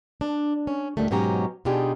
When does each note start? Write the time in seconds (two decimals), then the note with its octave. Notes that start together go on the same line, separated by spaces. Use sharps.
0.21 D4
0.67 C#4
0.97 D2 A#2 D#3 G3 A3
1.11 G#2 B2 F#3 C#4 G4 A#5
1.65 B2 D4 D#4 F4 G4 G#4